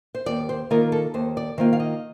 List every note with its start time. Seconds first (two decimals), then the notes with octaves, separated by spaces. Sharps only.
0.15 C5
0.26 D#2 D5
0.49 C5
0.71 D#3 A#3 F4 A#4
0.92 A4
1.14 D#2 C5
1.37 D5
1.58 D#3 A#3 F4 C5
1.73 F5
1.80 D#5